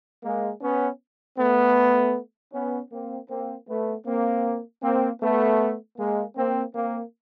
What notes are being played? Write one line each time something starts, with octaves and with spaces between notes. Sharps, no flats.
G#3 A#3
B3 C#4
A3 B3
B3 C#4
A#3 C4
A#3 C4
A3 B3
A#3 C4
A#3 C4
A3 B3
G#3 A#3
A#3 C4
A#3 C4